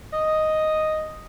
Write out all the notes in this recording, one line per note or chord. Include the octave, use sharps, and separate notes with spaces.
D#5